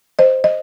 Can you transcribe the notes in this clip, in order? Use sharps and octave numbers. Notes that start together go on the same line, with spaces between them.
C5 D#5
D#5